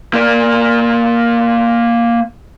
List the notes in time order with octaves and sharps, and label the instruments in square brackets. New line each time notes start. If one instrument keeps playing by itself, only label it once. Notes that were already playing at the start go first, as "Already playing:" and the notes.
[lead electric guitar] A#3 D5